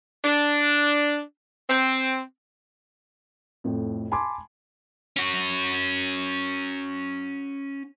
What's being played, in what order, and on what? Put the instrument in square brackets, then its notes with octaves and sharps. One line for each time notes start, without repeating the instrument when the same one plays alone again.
[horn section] D4
C4
[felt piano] F2 A2
G#5 A5 B5 C6 D6
[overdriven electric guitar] C#4 F#4